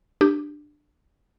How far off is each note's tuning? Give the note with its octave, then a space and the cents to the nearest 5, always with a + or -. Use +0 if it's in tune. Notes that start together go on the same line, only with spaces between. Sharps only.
D4 +15 G4 +0